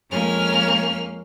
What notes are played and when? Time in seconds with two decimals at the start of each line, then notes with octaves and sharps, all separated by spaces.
0.10 F2 G#3 A#3 C#4 F6